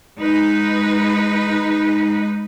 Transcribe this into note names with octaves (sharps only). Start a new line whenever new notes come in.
G#3 D#4 B4